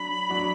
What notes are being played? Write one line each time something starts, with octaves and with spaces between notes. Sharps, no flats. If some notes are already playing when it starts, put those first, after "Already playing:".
Already playing: F#3 D4 F#4 B5
F#3 D4 F#4